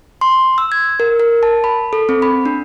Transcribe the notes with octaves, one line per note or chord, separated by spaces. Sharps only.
C6
E6
G#6
A#4
A#4
A5
B5
A4
C4
B5
D4